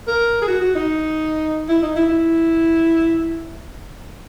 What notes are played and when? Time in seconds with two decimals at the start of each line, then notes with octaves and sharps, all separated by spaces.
0.07 A#4
0.42 G#4
0.48 F#4
0.61 F#4
0.75 D#4
1.69 E4
1.82 D#4
1.96 E4
2.09 E4